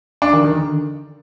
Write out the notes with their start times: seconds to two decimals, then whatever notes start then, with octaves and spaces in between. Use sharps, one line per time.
0.22 D4
0.33 D#3
0.44 D#3
0.56 D3